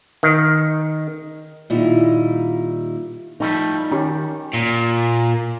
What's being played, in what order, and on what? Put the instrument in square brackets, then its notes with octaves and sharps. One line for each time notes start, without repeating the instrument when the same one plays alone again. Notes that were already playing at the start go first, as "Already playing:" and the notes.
[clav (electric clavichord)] D#3
[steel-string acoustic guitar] A#2 D#3 G3 D#4 E4
[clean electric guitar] F3 G3 A3 [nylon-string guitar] D#4
[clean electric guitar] D#3 [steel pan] C#4 G4
[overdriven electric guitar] A#2